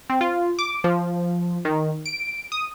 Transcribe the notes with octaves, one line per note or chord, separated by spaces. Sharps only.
C4
F4
D6
F3
D#3
D7
D#6